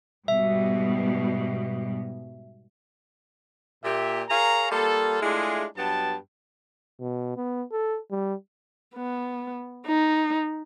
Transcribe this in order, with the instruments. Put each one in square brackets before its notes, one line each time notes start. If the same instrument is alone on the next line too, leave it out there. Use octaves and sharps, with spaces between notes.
[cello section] G#2 B2 G3 [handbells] E5
[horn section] A#2 G4 E5
G#4 A#4 C#5 F5 A#5
G3 A#3 F4 A4
G#3 A3 D4 E4 F4 G#4
G2 F#3 B3 G5 A5
[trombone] B2
B3
A4
G3
[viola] B3
D#4